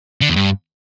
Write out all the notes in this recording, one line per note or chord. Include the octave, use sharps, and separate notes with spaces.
D3
E2
G2